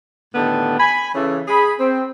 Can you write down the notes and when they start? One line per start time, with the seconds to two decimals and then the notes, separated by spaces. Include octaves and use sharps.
0.35 A2 D3 D#3 B3 G4 A5
0.78 G#5 B5
1.14 C#3 E3 A4
1.48 G#4 B5
1.79 C4